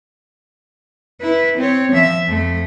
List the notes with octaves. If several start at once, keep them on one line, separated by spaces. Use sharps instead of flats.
E4 B4
C4 C#5
F3 E5
F2 A3